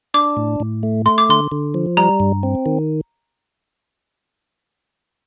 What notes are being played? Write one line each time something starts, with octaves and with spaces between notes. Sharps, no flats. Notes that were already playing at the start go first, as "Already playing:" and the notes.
D4 D6
A2
A2
A3
A3 C6
D6
D3 C6
D3
F3
G3 A#5
G2
C4
D#3